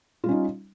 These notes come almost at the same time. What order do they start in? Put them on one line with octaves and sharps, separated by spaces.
F4 G3 C#4 D#4